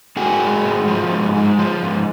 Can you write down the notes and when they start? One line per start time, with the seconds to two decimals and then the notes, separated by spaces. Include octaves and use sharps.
0.16 G#2 F#4 G#4
0.40 G#3
0.65 G#2
0.88 F3
1.11 G#2
1.35 G#3
1.58 F3
1.83 G#2